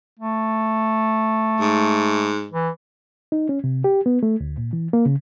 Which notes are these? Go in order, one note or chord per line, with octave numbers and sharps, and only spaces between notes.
A3
G#2
E3
D#4
C#4
C3
G4
B3
A3
D2
A#2
E3
A#3
C#3